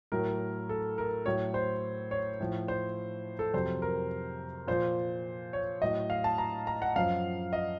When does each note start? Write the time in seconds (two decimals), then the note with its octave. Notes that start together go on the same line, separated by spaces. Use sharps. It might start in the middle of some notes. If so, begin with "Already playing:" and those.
0.12 A2 F#3 A#4
0.69 A4
0.98 A#4
1.26 A2 F#3 C#5
1.54 C5
2.11 C#5
2.40 A2 F3
2.68 C5
3.39 A4
3.54 F2 C3 F#3 C5
3.82 A#4
4.67 A#2 F3 C5
5.53 C#5
5.82 A2 F#3 D#5
6.10 F5
6.24 A5
6.38 A#5
6.67 A#5
6.82 F#5
6.96 F#2 F3 F5
7.53 D#5